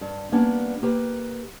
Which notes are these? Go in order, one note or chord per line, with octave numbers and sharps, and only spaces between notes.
G2
G3 A#3 B3 C#4 D4
A#3 G4 B4